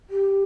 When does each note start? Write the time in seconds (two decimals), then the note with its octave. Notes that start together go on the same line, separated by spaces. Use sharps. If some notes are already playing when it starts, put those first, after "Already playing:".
0.10 G4